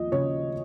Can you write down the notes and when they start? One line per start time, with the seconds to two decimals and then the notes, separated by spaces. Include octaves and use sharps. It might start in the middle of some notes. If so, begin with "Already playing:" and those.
Already playing: D#2 F3 D#5
0.12 C#3 C#5